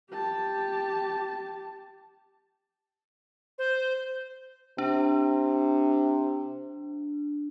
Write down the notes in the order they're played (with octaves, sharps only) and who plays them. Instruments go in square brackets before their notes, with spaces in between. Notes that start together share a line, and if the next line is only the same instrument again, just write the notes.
[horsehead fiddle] G4 A5
[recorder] C5
[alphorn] C3 [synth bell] D4